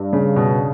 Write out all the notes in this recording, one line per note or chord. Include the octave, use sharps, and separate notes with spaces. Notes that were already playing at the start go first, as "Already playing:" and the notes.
Already playing: G2
C#3
B2